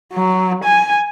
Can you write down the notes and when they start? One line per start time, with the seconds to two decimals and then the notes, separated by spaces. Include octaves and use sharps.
0.13 F#3
0.64 G#5